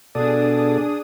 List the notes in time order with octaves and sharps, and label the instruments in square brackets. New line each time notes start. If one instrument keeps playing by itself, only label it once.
[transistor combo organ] B2 A4 D5 [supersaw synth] D4 G#4 D#6